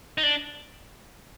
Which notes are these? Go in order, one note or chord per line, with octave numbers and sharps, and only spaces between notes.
D#4
D4